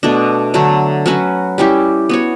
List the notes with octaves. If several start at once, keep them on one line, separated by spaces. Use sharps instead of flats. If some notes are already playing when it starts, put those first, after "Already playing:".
B2 A3 D4
D3 F#3 A3
F#3 C#4 F#4 B4
G3 C#4 E4 G4
B3 F#4 C#5